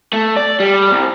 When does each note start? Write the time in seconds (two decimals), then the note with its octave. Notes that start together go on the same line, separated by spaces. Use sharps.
0.13 A3
0.37 D5
0.60 G3
0.92 C2